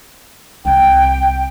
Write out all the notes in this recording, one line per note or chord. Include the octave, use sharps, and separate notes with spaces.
C2 E4 G5